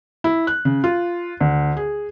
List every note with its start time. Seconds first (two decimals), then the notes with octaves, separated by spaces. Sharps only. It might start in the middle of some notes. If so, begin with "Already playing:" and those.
0.24 E4
0.47 F#6
0.65 C#3
0.84 F4
1.40 D2
1.77 G#4